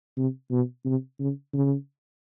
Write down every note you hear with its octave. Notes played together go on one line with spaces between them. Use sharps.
C3
B2
C3
C#3
C#3